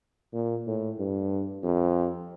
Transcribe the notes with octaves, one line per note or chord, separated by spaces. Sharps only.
A#2
A2
G2
F2